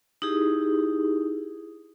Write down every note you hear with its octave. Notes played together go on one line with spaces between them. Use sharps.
D#4 E4 G4 G#4